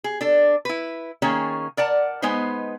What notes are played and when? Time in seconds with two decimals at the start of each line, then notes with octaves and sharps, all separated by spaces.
0.04 G#4
0.21 D4 A4
0.65 E4 B4
1.22 D#3 A#3 C#4 G#4 C#5
1.77 A#4 D5 F#5 A5
2.22 G#3 B3 D#4 B4 C5